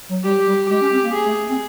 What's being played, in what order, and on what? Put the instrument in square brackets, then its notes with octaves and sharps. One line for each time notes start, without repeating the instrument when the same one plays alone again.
[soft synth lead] F#3
[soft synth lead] G3 [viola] G4
[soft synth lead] G3
[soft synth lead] G#3 [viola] G4
[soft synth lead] C#4
C4
A#3
[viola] G#4
[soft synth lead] A3
C4